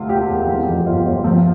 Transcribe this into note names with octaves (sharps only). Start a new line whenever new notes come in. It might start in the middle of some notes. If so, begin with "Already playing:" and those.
Already playing: D2 C3 F4
E1 G4
E1
E3
F2
G1 F4
G1
F3